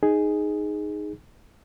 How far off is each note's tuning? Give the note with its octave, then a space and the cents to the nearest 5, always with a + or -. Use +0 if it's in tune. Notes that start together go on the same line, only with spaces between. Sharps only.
D#4 -5 G#4 +0